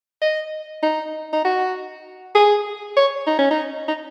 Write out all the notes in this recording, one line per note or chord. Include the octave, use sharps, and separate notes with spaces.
D#5
D#4
D#4
F#4
G#4
C#5
D#4
C#4
D#4
D#4